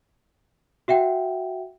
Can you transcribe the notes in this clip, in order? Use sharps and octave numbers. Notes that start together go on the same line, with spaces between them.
F#4 E5 F#5 G5